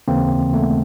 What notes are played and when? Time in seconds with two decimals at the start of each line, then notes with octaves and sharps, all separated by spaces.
0.08 D#2 C#3 E3 A#3 C4
0.53 A3 B3